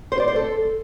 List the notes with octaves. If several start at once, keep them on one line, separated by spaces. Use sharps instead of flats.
C5
D5
C5
A4